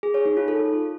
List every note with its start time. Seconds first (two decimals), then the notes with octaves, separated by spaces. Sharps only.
0.03 G#4
0.14 C#5
0.26 D#4
0.37 F4
0.48 A4